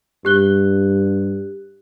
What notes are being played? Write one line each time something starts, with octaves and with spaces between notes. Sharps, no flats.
G2 G4 F#6 G7